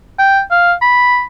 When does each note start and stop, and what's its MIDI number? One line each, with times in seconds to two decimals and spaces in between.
0.19 0.41 79
0.51 0.73 77
0.82 1.24 83